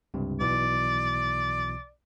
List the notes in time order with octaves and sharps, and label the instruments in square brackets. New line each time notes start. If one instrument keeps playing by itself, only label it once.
[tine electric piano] C#2 G2 C3
[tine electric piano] B1 B2 E3 [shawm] D5